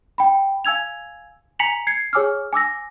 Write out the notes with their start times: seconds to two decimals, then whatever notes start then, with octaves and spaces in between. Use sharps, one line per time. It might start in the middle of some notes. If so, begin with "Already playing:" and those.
0.18 G5 B5
0.65 F5 G#5 E6 G#6 F7
1.59 G#5 A#5 B6 C#7 F7 F#7
1.87 G#6 C7 C#7
2.13 G#4 C#5 G#5 D6 E6 F6
2.53 G#5 D6 E6 A#6